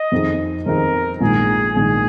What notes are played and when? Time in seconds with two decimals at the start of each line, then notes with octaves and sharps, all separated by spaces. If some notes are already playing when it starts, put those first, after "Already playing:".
Already playing: D#5
0.12 F2 D#3 C4 D#4 G#4
0.66 F2 D#3 C4 D#4 G#4 A#4
1.21 A#1 G#2 D#3 G#4
1.75 A#1 G#2 D#3 G#4